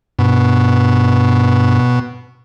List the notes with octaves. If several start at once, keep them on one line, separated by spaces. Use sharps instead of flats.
G2 B2